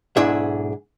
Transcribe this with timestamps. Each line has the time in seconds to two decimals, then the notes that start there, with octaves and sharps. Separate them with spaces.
0.17 B1 G#2 D4 E4 G#4 E5